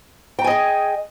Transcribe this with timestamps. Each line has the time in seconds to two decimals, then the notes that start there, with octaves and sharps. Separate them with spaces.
0.39 G5
0.41 A#5
0.44 G#5
0.47 D#5
0.50 G#4